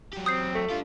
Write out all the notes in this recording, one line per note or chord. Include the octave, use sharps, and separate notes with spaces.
F#3 G4
C4 D#6 G6 C7
A3
D4 F4 G4